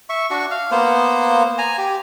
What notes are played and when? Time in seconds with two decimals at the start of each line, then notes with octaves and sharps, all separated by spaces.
0.09 E5 C#6
0.30 D4 F#4 C#6
0.51 F5
0.72 A#3 B3 C5
1.58 G#5 A#5
1.78 G4